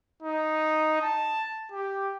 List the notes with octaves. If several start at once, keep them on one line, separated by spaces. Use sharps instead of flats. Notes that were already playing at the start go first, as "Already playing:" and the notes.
D#4
A5
G4